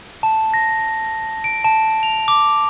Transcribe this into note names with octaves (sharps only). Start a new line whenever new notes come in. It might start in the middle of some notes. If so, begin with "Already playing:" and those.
A5
A#6
D7
A5
F7
D6